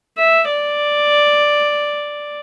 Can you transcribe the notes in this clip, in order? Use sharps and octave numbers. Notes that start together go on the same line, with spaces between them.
E5
D5